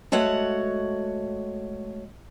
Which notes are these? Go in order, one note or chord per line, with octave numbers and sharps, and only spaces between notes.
G#3 A3 F#4 C#5 F#5